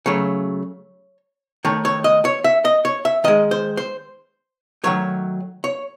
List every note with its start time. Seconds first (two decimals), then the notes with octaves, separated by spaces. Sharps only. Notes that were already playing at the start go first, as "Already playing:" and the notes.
0.06 C#3 F#3 A3 C#5
1.65 D#3 A3 C#5
1.85 C#5
2.04 D#5
2.25 C#5
2.44 E5
2.65 D#5
2.85 C#5
3.05 E5
3.24 D#3 G#3 D#5
3.51 C5
3.77 C5
4.84 D#3 F#3 A3 C#5
5.64 C#5